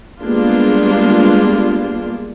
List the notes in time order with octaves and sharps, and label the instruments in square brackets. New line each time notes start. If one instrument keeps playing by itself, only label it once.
[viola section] G3 G#3 A#3 B3 D4 F4